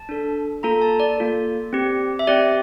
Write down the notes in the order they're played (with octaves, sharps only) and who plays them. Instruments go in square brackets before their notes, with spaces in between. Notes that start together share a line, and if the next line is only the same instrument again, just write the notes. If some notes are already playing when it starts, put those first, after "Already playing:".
Already playing: [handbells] A5
D4 A4
A#3 F4 A4 A#5
A5
D5
A#3 F4 A4
C4 G4
E5
C4 G4 D5